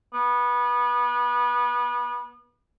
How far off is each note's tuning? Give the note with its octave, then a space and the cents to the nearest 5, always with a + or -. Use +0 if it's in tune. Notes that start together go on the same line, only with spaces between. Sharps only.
B3 -25